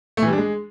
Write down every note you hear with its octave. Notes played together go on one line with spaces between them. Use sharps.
A3
E3
G3
D4
G#3